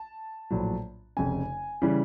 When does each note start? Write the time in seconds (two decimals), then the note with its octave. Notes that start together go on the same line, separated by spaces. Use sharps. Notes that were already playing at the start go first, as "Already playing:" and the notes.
Already playing: A5
0.50 A#1 A2 F#3
1.17 F1 F2 C#3 G#5
1.82 C#3 E3 G3